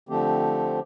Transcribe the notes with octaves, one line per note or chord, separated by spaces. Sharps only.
D3 F3 A3 C4 G4